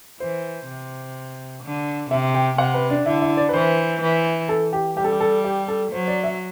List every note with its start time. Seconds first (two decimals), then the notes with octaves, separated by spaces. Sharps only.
0.20 E3 C5
0.68 C3
1.63 D3
2.10 C3 E5
2.34 G5
2.58 C3 F#5
2.74 B4
2.90 D4
3.06 D3 E4
3.21 E4
3.37 D5
3.49 B4
3.54 E3 C5
4.01 E3
4.49 A4
4.73 G4
4.97 G3 G4
5.04 A4
5.12 G4
5.20 A4
5.44 G4
5.68 A4
5.92 F#3 C5
6.08 D5
6.24 E5